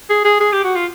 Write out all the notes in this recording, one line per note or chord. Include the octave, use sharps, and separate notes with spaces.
G#4
G#4
G#4
G4
F#4
F4